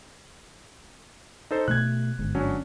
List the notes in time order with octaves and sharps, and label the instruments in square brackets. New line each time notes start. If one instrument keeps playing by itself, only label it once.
[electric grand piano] D#4 A4 C5
[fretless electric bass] B2 A3 [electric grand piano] F#6 G#6
[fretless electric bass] G1 G#2
[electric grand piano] F#3 C#4 D4